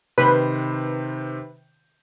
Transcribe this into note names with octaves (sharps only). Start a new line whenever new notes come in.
C3 D#3 B4 C5